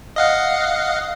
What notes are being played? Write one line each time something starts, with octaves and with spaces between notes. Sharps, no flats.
D#5 F5 F#5